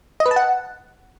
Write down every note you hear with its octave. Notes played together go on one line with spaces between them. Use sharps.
D#5
B4
A5
F#5